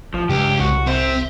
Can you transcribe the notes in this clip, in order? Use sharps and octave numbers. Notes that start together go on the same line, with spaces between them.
A1 F3
C#2 G2 G4
C2 F#4
C4 E5 C6